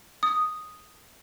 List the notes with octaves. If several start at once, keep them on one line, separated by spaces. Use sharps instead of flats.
D#6